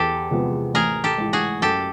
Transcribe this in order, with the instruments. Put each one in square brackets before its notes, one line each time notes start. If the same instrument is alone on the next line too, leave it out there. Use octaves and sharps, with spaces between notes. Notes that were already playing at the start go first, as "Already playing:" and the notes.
Already playing: [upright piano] E2 [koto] G4 A4
[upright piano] C3 F3 G#3 B3
[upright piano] A1 [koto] G#4 A#4
[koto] G4 A4
[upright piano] G#2 E3
[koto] F#4 G#4
[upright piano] F#2 [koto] G4 A4